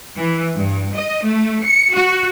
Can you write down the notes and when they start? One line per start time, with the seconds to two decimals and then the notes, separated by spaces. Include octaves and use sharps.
0.18 E3
0.57 G2
0.95 D#5
1.26 A3
1.63 C#7
1.93 F#4